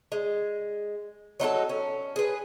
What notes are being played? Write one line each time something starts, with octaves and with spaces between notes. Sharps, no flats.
G#3
F#3 D#4 F4 A4
C#4
G#4 B4